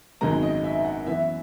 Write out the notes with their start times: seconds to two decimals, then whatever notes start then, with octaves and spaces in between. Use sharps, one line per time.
0.21 G#1 F#2 D#3 G#3 B3 A#5
0.43 D#5
0.64 E5
0.85 F#5
1.07 F#2 E3 B3 E5